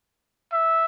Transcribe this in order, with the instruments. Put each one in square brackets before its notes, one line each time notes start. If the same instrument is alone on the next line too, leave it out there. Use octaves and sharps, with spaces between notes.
[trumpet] E5